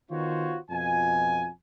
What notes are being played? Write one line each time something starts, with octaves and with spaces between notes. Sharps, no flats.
D#3 B3 F4 F#4 C5 C#5
F2 B2 F4 G#5